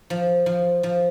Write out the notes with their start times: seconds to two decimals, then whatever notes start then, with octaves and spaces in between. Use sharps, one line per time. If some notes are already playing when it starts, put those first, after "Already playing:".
0.10 F3
0.46 F3
0.83 F3